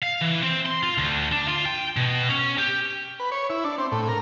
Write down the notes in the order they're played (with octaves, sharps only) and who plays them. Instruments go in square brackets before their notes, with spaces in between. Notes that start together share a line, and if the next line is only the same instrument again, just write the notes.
[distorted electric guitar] F5
E3
C4
C6
F4
D2
D4
F4
G5
B2
C#4
G4
[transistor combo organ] B4
C#5
E4
D4
C4
A2
A#4